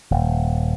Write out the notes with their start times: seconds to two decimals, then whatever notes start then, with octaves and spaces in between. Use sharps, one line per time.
0.11 D#1